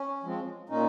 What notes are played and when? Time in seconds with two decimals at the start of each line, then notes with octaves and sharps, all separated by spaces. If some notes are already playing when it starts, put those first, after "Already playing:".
Already playing: C#4
0.24 F3 G#3 C4
0.69 A#2 C#4 D#4